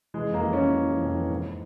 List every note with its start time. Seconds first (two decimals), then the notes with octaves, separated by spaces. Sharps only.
0.14 E3 G#3
0.29 F2 A#3
0.43 E3
0.53 E3 C#4
0.72 E3
0.87 E3
1.01 F2
1.15 E3
1.30 G#2